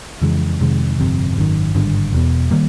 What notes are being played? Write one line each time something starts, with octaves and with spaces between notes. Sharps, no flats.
F2 C#3 E3 G#3
F2 C3 D#3 G#3
G1 F2 C3
G#1 F#2 D#3
G#1 G2 D3
E1 E2 B2
D#3 G3 A#3